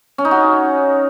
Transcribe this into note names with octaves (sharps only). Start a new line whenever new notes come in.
C#4
D#4
F#4